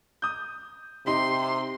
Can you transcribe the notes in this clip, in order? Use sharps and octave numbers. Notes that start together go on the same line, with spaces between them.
D#6 G6
C3 D#4 G4 C6